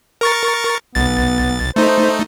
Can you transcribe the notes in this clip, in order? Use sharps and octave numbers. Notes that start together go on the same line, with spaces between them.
A#4 C#6 A6
B1 B3 A6
A3 D#4 C5